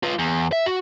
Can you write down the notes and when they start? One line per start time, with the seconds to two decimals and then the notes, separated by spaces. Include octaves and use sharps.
0.03 F4 B4
0.19 E2
0.52 E5
0.66 F#4